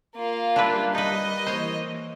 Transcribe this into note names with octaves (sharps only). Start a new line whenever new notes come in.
A#3 F4
G3 D4 E4 G4 A#4 B4
D#4 B4 D#5
E3 A#3 C5 C#5